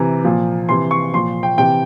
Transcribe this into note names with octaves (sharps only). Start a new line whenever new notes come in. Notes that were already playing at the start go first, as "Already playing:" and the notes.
Already playing: C3 E3 A#5
A#2 F3
C3 E3 C6
C#6
A#2 F3 C6
G5
C3 E3 G5